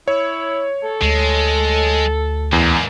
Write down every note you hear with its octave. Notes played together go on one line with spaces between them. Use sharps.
E4 C#5
A4
D2 G#3
E2 G#2 A#3